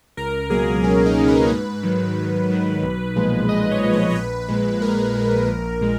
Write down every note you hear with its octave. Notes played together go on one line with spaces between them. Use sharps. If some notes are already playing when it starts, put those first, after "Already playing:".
C#2 A#4
B2 F#3 A#3 G#4
C#2 C#4
D#4
B2 F#3 A#3
B4
G#2 B4
D#3 F#3
G#2
D#3 F#3
B1
A#2 F3 G#3
B1 D#5
C#5
A#2 F3 G#3
B4
C#5
A#1 B4
A#2 G#3
A#1 A#4
A#2 G#3
A#1
A#2 G#3